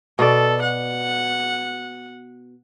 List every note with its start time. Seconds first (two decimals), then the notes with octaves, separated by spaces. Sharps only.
0.19 B2 A4 D5
0.62 F#5